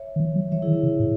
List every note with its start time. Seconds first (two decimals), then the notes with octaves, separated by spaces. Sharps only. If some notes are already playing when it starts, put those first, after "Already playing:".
Already playing: C#5 E5
0.16 D#3
0.20 E3
0.36 F#3
0.52 E3 C#5 E5
0.62 E4 G#4
0.68 D#3
0.73 E4
0.83 C#3
1.00 A2